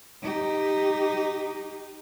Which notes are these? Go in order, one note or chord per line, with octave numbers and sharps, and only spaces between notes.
D#4 G4